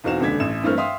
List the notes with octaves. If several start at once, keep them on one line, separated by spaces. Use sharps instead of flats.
B1 E2 C4 F#4 F5 E7
D#1 C#2 D3 D4 G#6 B6
A1 E7
G2 E3 A3 A#3 C4 F6
E5 F5 G5 C6 D#6